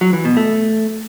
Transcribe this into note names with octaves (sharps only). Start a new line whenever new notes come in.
F#3
E3
B2
A3